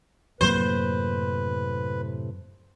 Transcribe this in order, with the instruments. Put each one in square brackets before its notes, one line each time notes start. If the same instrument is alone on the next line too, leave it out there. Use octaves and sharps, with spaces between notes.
[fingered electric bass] F#2 F#3 A#3 [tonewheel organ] A2 C3 [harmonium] B4 [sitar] C5